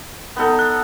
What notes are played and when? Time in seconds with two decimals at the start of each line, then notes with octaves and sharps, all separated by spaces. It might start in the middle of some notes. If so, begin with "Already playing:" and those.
0.36 B3 D#4 A4
0.59 F#6